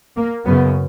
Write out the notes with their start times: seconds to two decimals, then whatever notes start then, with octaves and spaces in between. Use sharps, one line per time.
0.16 A#3
0.45 F#2 C#3 B3